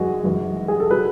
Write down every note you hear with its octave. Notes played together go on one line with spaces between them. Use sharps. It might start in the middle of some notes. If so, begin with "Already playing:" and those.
Already playing: F#2 E3 G#3 F#4 G#4
F#2 E3 G#3
G#4
A4
F#3 B4